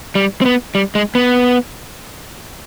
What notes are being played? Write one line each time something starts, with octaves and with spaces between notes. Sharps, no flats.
G3
C4
B3
G3
G#3
B3